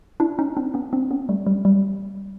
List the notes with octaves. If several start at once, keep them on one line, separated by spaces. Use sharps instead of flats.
D4 E4
C#4 D#4
C4 D4
B3 C#4
C4 D4
B3 C#4
G3 A3
G3
G3